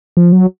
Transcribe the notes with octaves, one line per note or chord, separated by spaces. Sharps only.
F3
F#3